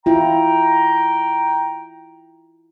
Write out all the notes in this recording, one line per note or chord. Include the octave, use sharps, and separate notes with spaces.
E4 F4 G5 A#5